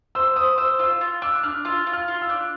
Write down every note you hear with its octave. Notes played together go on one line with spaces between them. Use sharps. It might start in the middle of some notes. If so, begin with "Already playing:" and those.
C5 E6
C5 D#6
C5 E6
F4 E6
F4
D4 E6
D4 F6
F4 E6
F4
F6
F4
E6
D4